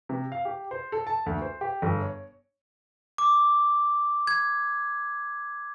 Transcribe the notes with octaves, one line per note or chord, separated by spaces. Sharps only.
C3
F5
G4
C5
A4
A5
D2
C5
G4
G1
C#5
D6
G#6